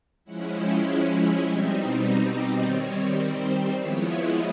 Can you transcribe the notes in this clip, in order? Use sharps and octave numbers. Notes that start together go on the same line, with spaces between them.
F3 G#3 C#4 E4 F#5
G5
F#5
E5
B2 G3 C4 D#4 E5
D#5
D5
D#3 G3 C4 C#5
C5
F3 G#3 B3 E4 C#5